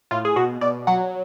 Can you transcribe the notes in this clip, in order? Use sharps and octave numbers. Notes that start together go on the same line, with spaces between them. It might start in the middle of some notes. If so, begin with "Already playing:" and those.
A2 F4
G#4
B2 F#4
B2 D5
F#3 F#5